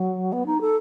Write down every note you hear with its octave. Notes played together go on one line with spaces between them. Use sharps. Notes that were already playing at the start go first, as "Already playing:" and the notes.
Already playing: F#3
B3
D#4
A4